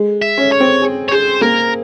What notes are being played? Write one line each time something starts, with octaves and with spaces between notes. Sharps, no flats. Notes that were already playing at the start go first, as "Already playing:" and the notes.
Already playing: G#3
E5
C#4
C#5
C4
G#4
C#5
G#4 C5
A#3 A#4